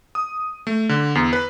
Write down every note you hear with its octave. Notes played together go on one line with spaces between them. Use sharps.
D#6
A3
D3
E2
B4